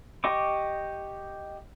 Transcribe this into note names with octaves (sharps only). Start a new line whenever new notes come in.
G4 D#5 C#6 D6